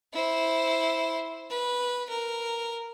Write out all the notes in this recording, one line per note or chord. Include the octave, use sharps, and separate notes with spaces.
E4 C5
B4
A#4